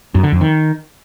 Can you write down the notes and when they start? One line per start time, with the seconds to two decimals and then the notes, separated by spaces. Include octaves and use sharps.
0.15 F#2
0.23 D3
0.32 F2
0.41 D#3